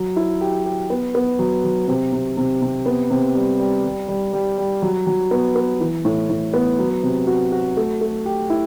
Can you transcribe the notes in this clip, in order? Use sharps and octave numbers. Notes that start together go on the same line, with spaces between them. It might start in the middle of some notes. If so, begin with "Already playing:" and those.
Already playing: F#3
E4
G4
G4
B3
B3
F#3
F#3
C3
C3
C3
C3
B3
C3
G3
G3
G3
G3
G3
G3
F#3
F#3
B3
B3
E3
A2
A2
B3
F#3
C3
F#4
F#4
A3
A3
G4
E4